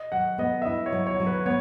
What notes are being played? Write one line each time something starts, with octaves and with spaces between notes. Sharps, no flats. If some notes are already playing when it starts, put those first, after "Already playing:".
Already playing: D#5
F#3 F#5
B3 D#5
E5
E4 D#5
C#5
F#3
C#5
F#3
B4
B3 C#5